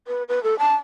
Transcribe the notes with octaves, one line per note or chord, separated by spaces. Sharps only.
B4
B4
A4
A5